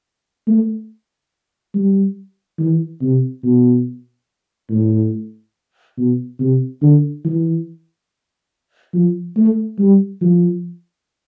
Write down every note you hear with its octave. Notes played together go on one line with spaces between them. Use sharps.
A3
G3
E3
C3
B2
A2
B2
C3
D3
E3
F3
A3
G3
F3